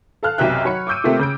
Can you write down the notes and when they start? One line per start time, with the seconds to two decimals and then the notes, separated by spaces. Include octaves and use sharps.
0.23 A4 F5 A5 F6 F#6
0.38 B1 F#2 C3 E5 G5 F#6
0.65 F#3 C#5 B5 C#7
0.87 C#6 D6 E6 G6 D7 D#7
1.04 C3 A3 A#3 C4 F4
1.19 C#3 G6 D7